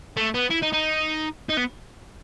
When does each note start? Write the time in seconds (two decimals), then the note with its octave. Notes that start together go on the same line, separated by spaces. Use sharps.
0.17 A3
0.34 B3
0.50 E4
0.62 D#4
0.72 D#4
1.49 D#4
1.57 B3